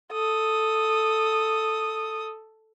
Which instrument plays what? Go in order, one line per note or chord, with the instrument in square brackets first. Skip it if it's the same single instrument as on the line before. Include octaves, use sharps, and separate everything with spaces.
[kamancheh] A4 D#6